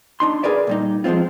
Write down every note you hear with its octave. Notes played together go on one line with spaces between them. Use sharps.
D4 D#4 C6
G#4 A#4 B4 D5 E5
A#2 G3 D#4
F3 G#3 A3 C4 F4